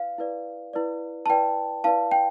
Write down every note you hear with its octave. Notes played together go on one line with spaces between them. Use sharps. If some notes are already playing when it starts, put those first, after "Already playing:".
Already playing: E4 B4 D5 F5
E4 B4 D5
E4 B4 D5
A5
E4 B4 D5 G5
E4 B4 D5 F5 A5
G5